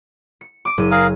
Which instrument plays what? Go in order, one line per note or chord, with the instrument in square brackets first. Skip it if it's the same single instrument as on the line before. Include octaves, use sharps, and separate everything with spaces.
[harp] C#7
D6 D7
F#1 D#7
[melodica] G#4 A#4 F5